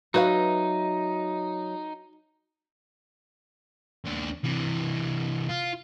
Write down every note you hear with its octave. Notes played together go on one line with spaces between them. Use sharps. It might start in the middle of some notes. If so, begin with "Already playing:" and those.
F#3 D#4 F#4 B4 E5 F5
D#2 D4
C3 E3
F4